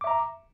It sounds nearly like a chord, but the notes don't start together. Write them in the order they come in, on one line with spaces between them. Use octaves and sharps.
D6 E5 A#5